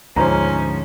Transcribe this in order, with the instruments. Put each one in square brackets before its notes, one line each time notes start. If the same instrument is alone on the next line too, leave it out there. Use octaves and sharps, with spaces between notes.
[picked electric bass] D2 [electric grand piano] G#2 F3 [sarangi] C#4 [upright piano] C5 A#5